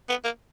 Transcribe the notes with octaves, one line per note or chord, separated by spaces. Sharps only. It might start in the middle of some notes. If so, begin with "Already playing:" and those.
B3
A#3